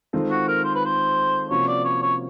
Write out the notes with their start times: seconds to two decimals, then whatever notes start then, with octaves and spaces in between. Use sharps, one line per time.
0.13 D#3 G#3 C4 F4 A4
0.30 F#4
0.48 A#4
0.64 C5
0.75 B4
0.85 C5
1.50 C3 F3 A#3 C#4 F#4 C#5
1.67 D5
1.84 C#5
2.02 C#5